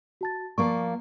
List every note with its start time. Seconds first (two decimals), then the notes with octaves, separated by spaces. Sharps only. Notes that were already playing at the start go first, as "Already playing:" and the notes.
0.21 F#4 A5 A6
0.58 F3 A#3 D5 C#6